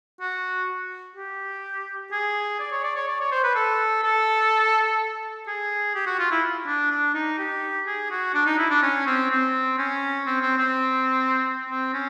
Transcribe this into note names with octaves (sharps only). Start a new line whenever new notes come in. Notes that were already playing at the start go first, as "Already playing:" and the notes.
F#4
G4
G#4
D5
C#5
D5
C#5
D5
C#5
C5
B4
A4
A4
G#4
G4
F#4
F4
E4
D4
D4
D#4
G4
G#4
F#4
D4
D#4
E4
D4
C#4
C4
C4
C#4
C4
C4
C4
C4
C#4